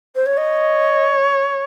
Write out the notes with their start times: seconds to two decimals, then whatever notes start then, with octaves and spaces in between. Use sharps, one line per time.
0.15 C5
0.26 C#5
0.36 C#5 D#5